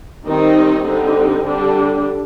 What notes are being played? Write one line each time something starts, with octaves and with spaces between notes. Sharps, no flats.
D#3 G3 C4 D#4
D3 G3 C4 D#4
D3 G3 D4